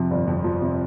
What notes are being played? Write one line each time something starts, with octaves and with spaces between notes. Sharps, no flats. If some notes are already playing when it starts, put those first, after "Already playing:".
Already playing: F2 C3 F3
G1
F2
F3
C3